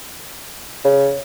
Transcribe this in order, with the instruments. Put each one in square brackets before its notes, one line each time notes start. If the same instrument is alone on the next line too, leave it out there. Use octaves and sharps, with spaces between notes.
[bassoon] C#3